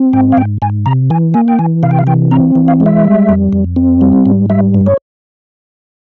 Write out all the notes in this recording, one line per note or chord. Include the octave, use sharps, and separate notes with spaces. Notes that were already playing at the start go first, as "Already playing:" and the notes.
Already playing: C4
G#2 G5
F5
G#2 G5
G#2 G#5
C3 A#5
E3 G#5
A#3 G#5
G5
E3 G#5
C3 F5
G5
F5
E3 G5
C4 A#5
E3
F5
G#3
E5
G3
F2
F2
C4
G3
G#2
G3 E5
G2
C#5